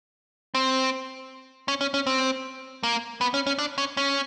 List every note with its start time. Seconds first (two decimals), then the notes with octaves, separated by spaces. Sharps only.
0.55 C4
1.68 C#4
1.81 C#4
1.94 C#4
2.07 C4
2.83 A#3
3.21 B3
3.34 C#4
3.47 C#4
3.59 D4
3.78 C#4
3.97 C#4